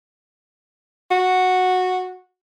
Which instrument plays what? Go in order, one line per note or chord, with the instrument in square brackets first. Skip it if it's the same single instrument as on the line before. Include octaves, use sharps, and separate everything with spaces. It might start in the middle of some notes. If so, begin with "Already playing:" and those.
[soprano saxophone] F#4